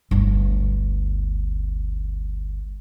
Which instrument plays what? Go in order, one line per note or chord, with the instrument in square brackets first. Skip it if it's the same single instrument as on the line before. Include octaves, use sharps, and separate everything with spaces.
[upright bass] G1 D2